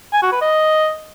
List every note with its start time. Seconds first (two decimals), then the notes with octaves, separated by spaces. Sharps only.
0.13 G#5
0.23 F#4
0.32 B4
0.42 D#5